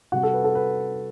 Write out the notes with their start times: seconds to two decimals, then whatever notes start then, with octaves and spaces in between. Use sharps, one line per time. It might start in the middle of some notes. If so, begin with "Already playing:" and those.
0.12 C3 G3 F#4 F#5
0.23 A4
0.34 B4
0.44 A4
0.55 B4